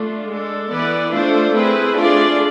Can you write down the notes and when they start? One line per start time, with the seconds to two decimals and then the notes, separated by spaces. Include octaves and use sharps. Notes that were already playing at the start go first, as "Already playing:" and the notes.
Already playing: A3 D4 F4
0.28 G#3 D4 A4
0.70 E3 B3 E4 B4 D5
1.12 A3 D4 F4 A4 C5
1.54 A3 C4 E4 G#4 B4
1.96 A3 D4 F4 G#4 D5